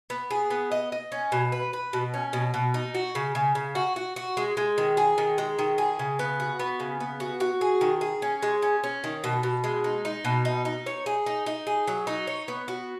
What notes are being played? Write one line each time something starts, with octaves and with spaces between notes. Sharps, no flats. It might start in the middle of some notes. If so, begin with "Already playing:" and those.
B3
G#4
B3
D#5
D#5
C#4
B2
B4
B4
B2
C#4
B2
B2
D#4
F#4
C#3
C#3
C#3
F#4
F#4
F#4
G#3
G#3
D#3
G#4
D#3
G#3
D#3
G#4
C#3
B3
F#4
B3
C#3
B3
F#4
F#4
G#4
D#3
G#4
C#4
G#3
C#4
C#4
D#3
B2
B2
G#3
D#4
D#4
B2
D#4
D#4
C#5
G#4
D#4
D#4
G#4
F#3
D#4
C#5
B3
F#4